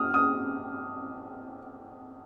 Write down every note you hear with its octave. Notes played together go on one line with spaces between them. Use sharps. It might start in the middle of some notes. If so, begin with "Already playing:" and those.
Already playing: D#6 F6
D#6